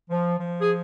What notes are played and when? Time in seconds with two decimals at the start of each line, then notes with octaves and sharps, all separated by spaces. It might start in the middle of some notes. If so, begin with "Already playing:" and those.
0.09 F3
0.39 F3
0.60 G#4